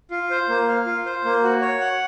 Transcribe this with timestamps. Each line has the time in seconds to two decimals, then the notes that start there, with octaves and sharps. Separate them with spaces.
0.11 F4
0.30 C5
0.49 A#3
0.68 F5
0.86 F4
1.06 C5
1.25 A#3
1.43 F#4
1.61 C#5
1.80 F#5